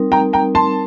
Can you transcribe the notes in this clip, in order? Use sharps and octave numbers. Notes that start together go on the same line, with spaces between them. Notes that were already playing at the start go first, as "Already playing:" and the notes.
Already playing: G3 C4 D#4 A#4
G5 A#5
G5 A#5
A5 C6